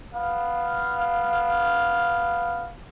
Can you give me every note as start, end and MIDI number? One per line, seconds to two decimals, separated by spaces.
0.14 2.70 59
0.14 2.70 77